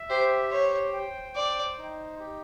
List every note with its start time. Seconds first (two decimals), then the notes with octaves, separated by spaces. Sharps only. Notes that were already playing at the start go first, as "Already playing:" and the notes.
Already playing: E5
0.10 G4 C5
0.51 C5 C#5
0.93 G5
1.36 C5 D5
1.78 D#4
2.19 G4